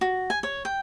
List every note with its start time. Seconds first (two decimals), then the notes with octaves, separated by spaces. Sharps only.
0.01 F#4
0.30 G#5
0.43 C#5
0.65 G5